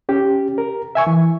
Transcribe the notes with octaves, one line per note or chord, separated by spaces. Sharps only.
C#4 G4
A#4
E5 G#5 C#6
E3